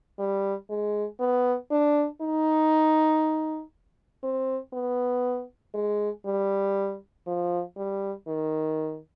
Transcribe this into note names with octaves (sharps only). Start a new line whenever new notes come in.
G3
G#3
B3
D4
D#4
C4
B3
G#3
G3
F3
G3
D#3